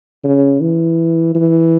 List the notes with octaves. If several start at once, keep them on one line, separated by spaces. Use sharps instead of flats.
C#3
E3
E3